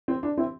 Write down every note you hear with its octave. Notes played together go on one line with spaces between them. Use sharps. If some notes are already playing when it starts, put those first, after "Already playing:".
C4
D4
C4 E4